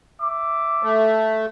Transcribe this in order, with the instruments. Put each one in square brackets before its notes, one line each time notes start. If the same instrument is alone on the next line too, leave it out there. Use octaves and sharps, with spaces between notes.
[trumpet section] E5 D6
[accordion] A3